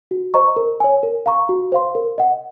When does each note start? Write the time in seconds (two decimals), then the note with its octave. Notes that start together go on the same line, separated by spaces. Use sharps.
0.11 F#4
0.34 C5 D#5 A#5 C#6
0.56 A#4
0.80 C#5 G#5
1.03 A#4
1.26 F5 A#5 C#6
1.49 F#4
1.72 C5 F5 C6
1.95 A#4
2.18 D#5 F#5